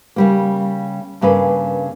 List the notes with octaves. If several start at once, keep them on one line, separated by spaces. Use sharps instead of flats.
C#3 G3 A#3
G2 C#3 A#3 B4